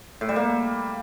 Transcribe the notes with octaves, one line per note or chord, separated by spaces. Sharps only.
A2
G3
A#3